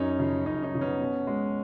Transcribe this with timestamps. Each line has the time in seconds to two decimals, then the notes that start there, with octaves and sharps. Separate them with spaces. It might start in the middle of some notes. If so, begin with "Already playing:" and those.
Already playing: F#2 C#4 D#4
0.19 C#3 F3
0.45 F#2 C#4 D#4
0.63 C#4 D#4
0.72 C#3 F3
0.81 B3 C#4
0.99 B2
1.27 G#3